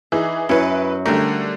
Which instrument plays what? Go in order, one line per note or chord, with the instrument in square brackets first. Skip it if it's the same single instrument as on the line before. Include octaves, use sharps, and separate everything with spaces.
[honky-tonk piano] E3 G#4 [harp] D#4 E5
[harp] F#2 C#4 C#5 [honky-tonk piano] E4 B4
[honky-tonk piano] D3 A3 [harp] G3 A#4